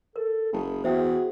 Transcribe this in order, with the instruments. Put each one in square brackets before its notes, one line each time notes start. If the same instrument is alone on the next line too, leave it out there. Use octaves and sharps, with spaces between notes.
[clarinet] A4 [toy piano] A#4
[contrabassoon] F#1 [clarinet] G#4
[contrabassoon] E2 [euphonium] F#4 [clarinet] G#4 [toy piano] C5 E5 G5